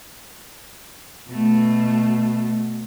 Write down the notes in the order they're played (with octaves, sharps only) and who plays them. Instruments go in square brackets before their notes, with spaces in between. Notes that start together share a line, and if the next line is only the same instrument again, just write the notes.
[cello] B2 A3